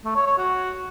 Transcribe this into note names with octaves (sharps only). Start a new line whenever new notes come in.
A3
C#5
C#5
F#4